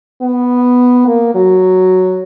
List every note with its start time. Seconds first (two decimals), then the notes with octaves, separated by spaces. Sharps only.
0.22 B3
1.07 A#3
1.35 F#3